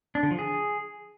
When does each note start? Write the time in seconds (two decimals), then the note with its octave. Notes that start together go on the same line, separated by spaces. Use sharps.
0.15 D4
0.23 D3
0.31 F3
0.39 G#4